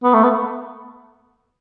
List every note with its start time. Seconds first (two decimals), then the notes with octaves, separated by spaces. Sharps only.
0.03 B3
0.13 A3
0.23 B3